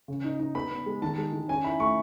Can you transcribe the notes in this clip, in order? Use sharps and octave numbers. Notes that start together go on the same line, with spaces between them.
C#3
D#4
D#4
B3 B5
B3
G#3
D#3 A5
G#3
D#3
C#4 G#5
E4 B5
A3 C#6